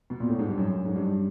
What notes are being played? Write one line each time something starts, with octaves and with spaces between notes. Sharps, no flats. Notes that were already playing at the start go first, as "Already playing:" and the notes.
B2
A#2
A2
G#2
G2
F#2
F#2
G#2
G2